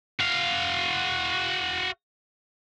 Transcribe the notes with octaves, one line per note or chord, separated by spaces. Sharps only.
F#4 F5